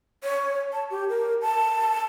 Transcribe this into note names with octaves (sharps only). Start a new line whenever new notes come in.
C#5
A5
G4
A#4
A5